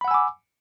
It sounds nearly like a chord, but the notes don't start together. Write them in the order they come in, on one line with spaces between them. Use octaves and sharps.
B5 F#5 E6 G#5 D6